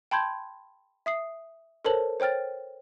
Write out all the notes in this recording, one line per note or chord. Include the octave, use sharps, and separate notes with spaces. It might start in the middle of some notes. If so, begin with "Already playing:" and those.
G5 A5 B5 C6 G6 G#6
E5 D#6 C7
A4 A#4 C5 C#5 A5 F#7
C5 C#5 G5 F6 A6